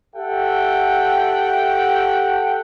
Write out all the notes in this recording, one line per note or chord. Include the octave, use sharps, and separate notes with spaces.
G4 A4 E5 F#5 G5